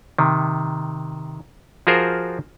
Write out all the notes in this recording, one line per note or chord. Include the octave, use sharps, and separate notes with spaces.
C3 D#3
F3 F4 F#4 G#4 A#4 C5